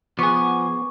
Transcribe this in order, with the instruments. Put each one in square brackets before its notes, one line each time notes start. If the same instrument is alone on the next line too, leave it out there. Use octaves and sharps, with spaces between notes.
[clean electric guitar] F3 G#4 [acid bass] B3 [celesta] C#6 D6